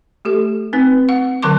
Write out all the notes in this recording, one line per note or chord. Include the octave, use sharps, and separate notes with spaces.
A3 G4 A4
C4 D#4 B4
F#5
D3 F#3 B4 A5 C6 D6